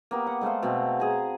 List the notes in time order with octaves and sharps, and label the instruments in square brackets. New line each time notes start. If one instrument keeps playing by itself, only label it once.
[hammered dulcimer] A#3 B3 G4
F#5
G#3 A3 C5 F5
B2 A3 B3 C4
G#4 A#5